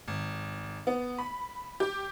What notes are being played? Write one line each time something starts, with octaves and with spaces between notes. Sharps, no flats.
G#1
B3
B5
G4